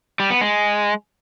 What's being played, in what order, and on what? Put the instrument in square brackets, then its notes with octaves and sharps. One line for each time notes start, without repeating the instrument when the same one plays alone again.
[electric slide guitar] G3
B3
G#3